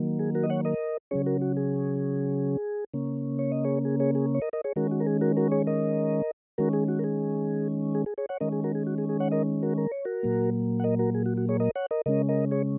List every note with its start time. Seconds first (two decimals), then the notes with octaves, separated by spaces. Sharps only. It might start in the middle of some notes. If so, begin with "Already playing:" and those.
Already playing: D#3 F#3 A#3
0.19 G#4
0.35 F#4 A#4
0.43 D#5
0.50 C#5 F#5
0.65 A#4 D#5
1.11 C#3 F#3 C#4 G#4 C#5
1.26 F#4 A#4
1.42 F#4
1.57 G#4
2.94 C#3 A#3 C#4
3.39 C#5
3.52 D#5
3.64 G#4 C#5
3.85 G#4
4.00 G#4 C#5
4.15 G#4
4.35 C#5
4.42 A#4 D#5
4.53 A#4 D#5
4.64 G#4 C#5
4.76 D#3 G#3 C#4 F#4 A#4
4.91 F#4
5.00 A#4
5.06 G#4
5.21 F#4 A#4
5.37 F#4 A#4
5.52 G#4 C#5
5.67 A#4 D#5
6.58 D#3 G#3 C#4 F#4 A#4
6.73 G#4
6.88 F#4
6.99 A#4
7.04 G#4
7.95 G#4
8.06 G#4
8.18 G#4 C#5
8.29 C#5 F#5
8.40 D#3 G#3 C#4 A#4 D#5
8.52 G#4
8.64 F#4 A#4
8.75 G#4
8.87 F#4
8.98 G#4
9.09 G#4
9.20 C#5 F#5
9.32 A#4 D#5
9.63 F#4 A#4
9.78 A#4
9.91 C#5
10.05 F#4 A#4
10.23 A#2 F#3 A#3
10.80 F#5
10.84 A#4 D#5
10.99 F#4 A#4
11.15 G#4
11.26 F#4
11.37 F#4
11.49 G#4 C#5
11.60 A#4 D#5
11.76 C#5 F#5
11.91 A#4 D#5
12.06 C#3 G#3 C#4 A#4 D#5
12.29 A#4 D#5
12.51 G#4 C#5